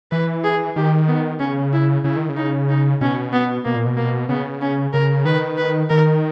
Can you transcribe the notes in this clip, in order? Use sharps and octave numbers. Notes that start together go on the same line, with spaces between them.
E3 B4
G#4
D#3 G4
B3
C#3 C#4
E4
C#3 E4
D#3
C#3
D#4
D#4
B2 C#4
B3
B2 A#3
A#2
B2
A#3
C#3 B3
C#4
C#3 A#4
D#3 B4
B4
D#3 A#4